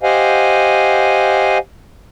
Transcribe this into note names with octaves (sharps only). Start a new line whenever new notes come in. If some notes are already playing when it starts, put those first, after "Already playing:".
G4 C5 D#5 F5 F#5 G#5